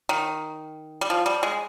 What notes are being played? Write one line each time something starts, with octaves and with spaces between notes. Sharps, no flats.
D#3
G3
F3
G3
G#3